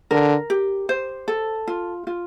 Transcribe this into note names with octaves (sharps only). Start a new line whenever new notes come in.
D3 A#4
G4
C5
A4
F4
F4